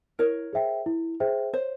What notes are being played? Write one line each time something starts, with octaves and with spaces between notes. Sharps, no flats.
E4 A#4 C#5
G#4 C5 E5 G5
E4
G#4 C5 E5 G5
C5 C#5